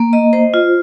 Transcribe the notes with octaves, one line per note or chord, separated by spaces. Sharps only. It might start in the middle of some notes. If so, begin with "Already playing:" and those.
Already playing: A#3
D#5
C5
F4